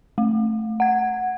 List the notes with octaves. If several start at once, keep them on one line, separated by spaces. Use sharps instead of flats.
A3
F#5 G#6